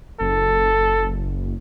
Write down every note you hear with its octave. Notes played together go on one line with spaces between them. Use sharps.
F#1 A4